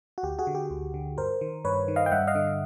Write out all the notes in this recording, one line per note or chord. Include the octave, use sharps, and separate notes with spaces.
F#4
D2 G4
F#4 G#4
D3
G4
D2
D3
G2 A#4 C5
D#3
G2 B4 C#5
D#3
D#5 F5
G5
G2 E5 F#5
D#5 F5
D3